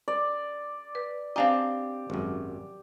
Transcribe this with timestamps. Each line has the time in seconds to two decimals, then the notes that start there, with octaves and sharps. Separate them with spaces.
0.08 D5
0.95 B4
1.36 C4 D4 G4 D#5 F5 G#5 A#5
2.10 G#1 F#2